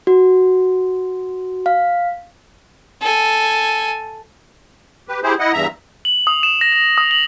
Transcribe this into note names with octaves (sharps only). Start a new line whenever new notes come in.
F#4
F5
A4 G#5
G4 B4
E4 G4 G#4 C5
E4 D#5 F#5
E2 G2 E5 A#5
F#7
D#6
E7
A#6
A#6
D#6
F#7